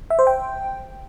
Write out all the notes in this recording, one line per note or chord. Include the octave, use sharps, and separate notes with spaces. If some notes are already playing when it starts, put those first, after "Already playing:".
E5
C5
G5